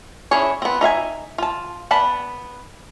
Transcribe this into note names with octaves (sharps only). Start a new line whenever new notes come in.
C#4 D4 E4 G#4 C#5
B3 C4
D#4 E5 F5 G#5
F4 A5
B3 D5 A5 B5